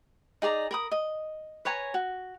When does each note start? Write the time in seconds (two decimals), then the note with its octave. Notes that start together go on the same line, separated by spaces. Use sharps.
0.42 D#4 G#4 D5 A#5
0.71 A#4 B5 D#6
0.92 D#5
1.65 B4 C#5 G#5 A#5
1.94 F#4